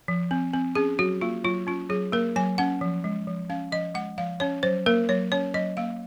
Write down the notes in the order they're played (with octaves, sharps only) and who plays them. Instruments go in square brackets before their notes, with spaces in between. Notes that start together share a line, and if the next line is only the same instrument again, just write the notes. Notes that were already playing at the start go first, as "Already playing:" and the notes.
[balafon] F3
C4
C4
C#4 G#4
F#3 F#4
A#3 F4
F#3 F4
C#4 F4
F#3 G#4
A#3 A#4
F#3 G#5
C#4 F#5
F3
G#3
F3
C#4 F5
F3 D#5
G#3 F#5
F3 F5
C#4 C#5
F#3 C5
A#3 A#4
F#3 C#5
C#4 C#5
F#3 D#5
A#3 F5